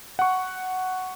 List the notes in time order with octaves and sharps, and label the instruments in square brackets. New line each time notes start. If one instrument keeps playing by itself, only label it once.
[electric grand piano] F#5 C#6